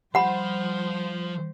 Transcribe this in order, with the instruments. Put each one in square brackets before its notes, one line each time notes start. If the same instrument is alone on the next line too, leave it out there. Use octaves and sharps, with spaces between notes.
[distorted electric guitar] F3 [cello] G3 C5 [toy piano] F#5 B5